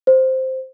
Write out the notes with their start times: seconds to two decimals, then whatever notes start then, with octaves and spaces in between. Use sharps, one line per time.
0.07 C5